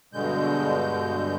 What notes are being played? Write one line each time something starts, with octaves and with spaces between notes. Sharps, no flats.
G2 B2 D3 G#3 G6